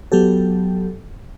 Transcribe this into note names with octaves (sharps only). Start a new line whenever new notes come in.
F#3 B3 G4 A4